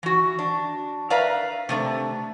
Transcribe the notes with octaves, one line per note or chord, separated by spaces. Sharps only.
E3 F#4
D4
A#4 B4 D5 E5 F5 A#5
C3 A3 D4